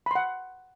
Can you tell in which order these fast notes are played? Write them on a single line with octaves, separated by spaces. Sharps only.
B5 C6 F#5